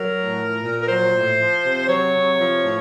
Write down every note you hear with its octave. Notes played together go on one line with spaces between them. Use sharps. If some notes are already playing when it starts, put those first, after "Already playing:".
Already playing: F#3 A#4
A2
F3
A#2
A#4
F#3 C5
A2
F3
C3
F#3 C#5
C3
F3
A2